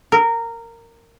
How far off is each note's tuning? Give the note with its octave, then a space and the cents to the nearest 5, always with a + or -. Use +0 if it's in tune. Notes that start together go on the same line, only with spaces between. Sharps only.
A#4 -15